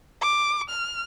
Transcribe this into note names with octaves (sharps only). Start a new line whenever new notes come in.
D6
F6